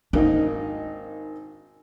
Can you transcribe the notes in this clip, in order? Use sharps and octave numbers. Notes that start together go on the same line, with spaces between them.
G#1 A#3 D4 D#4